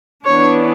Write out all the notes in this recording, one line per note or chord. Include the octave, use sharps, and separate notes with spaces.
E3 B3 D4 C#5